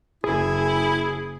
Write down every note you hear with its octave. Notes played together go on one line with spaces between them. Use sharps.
F#1 E4 G#4